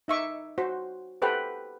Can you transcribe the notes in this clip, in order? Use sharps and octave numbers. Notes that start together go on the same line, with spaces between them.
D#4 E5 C#6 D6
F#4 C5
G4 A4 B4 C5 F#5 G5